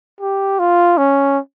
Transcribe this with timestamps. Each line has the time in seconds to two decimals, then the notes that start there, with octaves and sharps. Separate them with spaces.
0.20 G4
0.59 F4
0.98 C#4